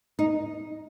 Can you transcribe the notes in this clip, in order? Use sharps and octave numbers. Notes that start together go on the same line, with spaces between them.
D#4